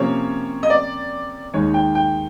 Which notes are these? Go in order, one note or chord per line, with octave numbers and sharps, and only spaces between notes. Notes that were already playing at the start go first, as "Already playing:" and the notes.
Already playing: C3 F3 A#3 C#4 C#5
D#5
D5
D#2 D#3 G#3 C#5
G5
G5